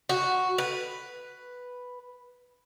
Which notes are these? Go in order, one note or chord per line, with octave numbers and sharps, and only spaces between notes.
F#4
B4